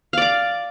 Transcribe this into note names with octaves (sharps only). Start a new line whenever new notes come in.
D5 F5 D6